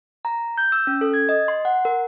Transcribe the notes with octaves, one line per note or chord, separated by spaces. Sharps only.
A#5
G6
E6
C#4
A4
G#6
D#5
C6
F#5
A#4